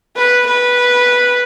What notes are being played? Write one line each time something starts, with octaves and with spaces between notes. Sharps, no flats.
B4
B4